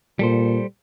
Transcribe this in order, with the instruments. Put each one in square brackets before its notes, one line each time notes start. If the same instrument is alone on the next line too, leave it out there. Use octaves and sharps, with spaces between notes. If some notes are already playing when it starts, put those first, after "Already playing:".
[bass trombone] A#2 [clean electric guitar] G3 A4 C5